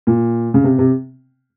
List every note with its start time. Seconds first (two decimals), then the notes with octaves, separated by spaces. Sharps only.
0.07 A#2
0.54 C#3
0.64 C3
0.79 C3